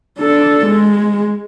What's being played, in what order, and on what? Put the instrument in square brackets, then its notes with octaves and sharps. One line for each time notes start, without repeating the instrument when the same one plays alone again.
[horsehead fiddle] D4 A4
G#3